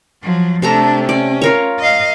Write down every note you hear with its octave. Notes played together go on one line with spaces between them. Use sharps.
F3 F#3
C3 A3 D4 A4 A#5
C#4 D5
F4 A#4 C#5
D#5 F5